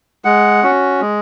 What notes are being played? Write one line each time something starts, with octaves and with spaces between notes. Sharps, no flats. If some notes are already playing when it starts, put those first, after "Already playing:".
G#3 F#5
C#4 F#4
G#3